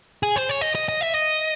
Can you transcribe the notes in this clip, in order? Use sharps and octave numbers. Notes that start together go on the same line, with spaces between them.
G#4
C5
C#5
D#5
D#5
D#5
E5
D#5